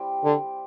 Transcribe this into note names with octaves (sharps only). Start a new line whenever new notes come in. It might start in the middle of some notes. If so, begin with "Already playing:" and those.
Already playing: G3 C4 E4 G4
D3